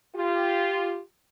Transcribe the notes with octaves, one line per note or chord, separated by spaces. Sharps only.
F4 G4